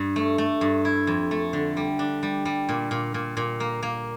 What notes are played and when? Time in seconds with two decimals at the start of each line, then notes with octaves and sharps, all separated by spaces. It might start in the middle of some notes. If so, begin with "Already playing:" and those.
Already playing: G2
0.16 A3
0.38 A3
0.61 G2
0.85 E4
1.07 F2
1.31 A3
1.53 D3
1.77 G3
1.99 D4
2.23 G3
2.45 G3
2.69 A#2
2.91 A#2
3.14 A#2
3.37 A#2
3.60 A#3
3.83 A#3